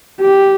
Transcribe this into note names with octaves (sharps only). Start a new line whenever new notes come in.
G4